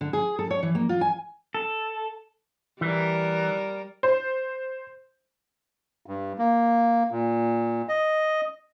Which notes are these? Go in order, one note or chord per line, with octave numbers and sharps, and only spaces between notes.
D3
G#4
A4
C#5
E3
A#3
F4
G#5
A4
E3 G3 A#4
C5
G2
A#3
A#2
D#5